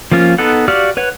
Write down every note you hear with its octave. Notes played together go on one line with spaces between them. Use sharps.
F3 A#3 C#4 F4
B3 D#4 A4 F#5
F#4 G4 D5 F5 F6
B4 C#5 F#5